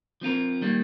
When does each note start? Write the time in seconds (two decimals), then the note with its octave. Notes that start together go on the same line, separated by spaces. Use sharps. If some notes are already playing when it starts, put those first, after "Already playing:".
0.21 F3 C4 F4 A#4
0.62 D#3 G3 A#3